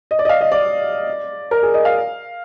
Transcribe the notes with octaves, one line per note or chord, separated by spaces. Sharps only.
D#5
D5
D#5
F5
D#5
D5
A#4
G#4
D#5
F5